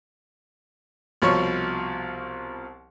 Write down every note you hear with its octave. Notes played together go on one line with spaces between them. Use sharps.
C2 B2 F3 C#5 C#6